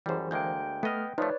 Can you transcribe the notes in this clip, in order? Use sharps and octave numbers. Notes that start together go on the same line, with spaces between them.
F#2 E3 G3 G#4 C5
D2 G#3 A#3 G5 G6
A3 B3 D#5 F6
F3 A3 D#4 B4 C#5 D5